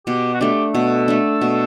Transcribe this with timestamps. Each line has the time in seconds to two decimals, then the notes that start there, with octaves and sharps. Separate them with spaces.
0.07 B2 G4
0.34 F#4
0.41 A3 D4 G4
0.74 B2 A4
1.08 A3 D4
1.41 B2